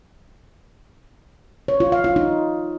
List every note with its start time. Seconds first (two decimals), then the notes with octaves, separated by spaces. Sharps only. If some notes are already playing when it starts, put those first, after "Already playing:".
1.68 C#5
1.80 F4
1.92 F5
2.04 F4
2.16 D#4